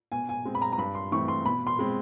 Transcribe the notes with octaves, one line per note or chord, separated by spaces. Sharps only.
B2 G#5
G#5
G#3 C4
B5
A#5
A#5
G2 B5
C6
E3 A3 C4 C#6
C6
B2 B5
C6
G#3 C4